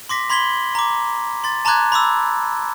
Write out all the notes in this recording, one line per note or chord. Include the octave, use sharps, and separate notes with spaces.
C6 D6 A#6 B6
B5 C6 G#6 B6 F#7 G7
A#5 D6
C6 A6
A5 A#5 C6 D6 F#6 G#6
B5 C6 D6 E6